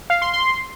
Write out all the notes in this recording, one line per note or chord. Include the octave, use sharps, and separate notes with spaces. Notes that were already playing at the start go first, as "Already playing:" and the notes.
F5
C6
C6